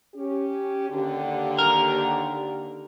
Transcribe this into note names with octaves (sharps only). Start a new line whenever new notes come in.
C#4 G4
D#2 D3 G4
A#4